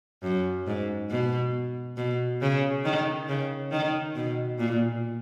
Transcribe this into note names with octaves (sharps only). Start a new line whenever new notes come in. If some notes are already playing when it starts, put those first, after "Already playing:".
F#2
G#2
B2
B2
C#3
D#3
C#3
D#3
B2
A#2